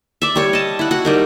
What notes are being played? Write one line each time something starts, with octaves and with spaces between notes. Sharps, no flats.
D5 E5
G3 C#5
D#5 A5
E4 F#5
F#4 F#5
G3 D#4 A#4